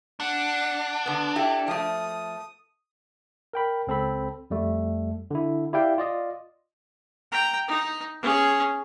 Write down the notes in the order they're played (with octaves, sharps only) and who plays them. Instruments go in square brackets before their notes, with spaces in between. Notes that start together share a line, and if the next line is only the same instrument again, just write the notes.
[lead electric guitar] D4 [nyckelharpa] F#5
[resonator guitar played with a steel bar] D3 B3
[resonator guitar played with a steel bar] E4 G4 [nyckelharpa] A4
[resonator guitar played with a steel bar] F3 A3 [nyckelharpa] D#6
[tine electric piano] A#4 G5 B5
C#2 C4 A4 B5
F2 G3 A3
D3 E4
E4 G4 D5 E5 F5 G5
F4 D5 D#5
[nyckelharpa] G5 A#5
D#4
C#4 G#4